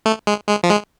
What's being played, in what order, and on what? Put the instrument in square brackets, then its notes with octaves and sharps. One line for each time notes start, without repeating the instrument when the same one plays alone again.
[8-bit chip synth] A3
G#3
G#3
F3
G#3